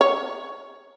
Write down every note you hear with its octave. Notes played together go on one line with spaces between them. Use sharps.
C#5